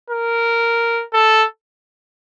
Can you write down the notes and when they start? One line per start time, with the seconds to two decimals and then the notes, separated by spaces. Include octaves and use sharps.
0.10 A#4
1.13 A4